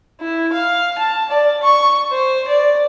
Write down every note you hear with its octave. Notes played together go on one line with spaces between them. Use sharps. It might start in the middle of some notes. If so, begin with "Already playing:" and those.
E4
F5
A5
D5
C#6
C5
D5